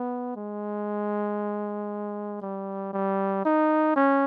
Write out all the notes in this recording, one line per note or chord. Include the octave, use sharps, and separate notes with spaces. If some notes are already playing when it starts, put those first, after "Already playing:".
Already playing: B3
G#3
G3
G3
D#4
C#4